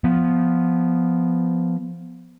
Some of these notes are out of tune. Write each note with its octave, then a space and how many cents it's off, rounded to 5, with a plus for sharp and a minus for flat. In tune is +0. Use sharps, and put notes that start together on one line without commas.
F3 +0 B3 +0